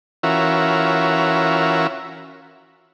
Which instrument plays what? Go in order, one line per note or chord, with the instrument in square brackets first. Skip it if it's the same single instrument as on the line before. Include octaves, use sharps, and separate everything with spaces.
[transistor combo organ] E3 C#4 F4 F#4 A#4 E5